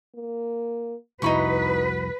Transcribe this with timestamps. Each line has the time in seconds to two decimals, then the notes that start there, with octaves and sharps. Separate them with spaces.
0.15 A#3
1.22 C2 F2 D#4 E4 F#4 B4 B5 C#6